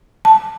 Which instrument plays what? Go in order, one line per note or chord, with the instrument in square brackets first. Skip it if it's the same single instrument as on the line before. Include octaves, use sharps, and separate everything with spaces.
[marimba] A5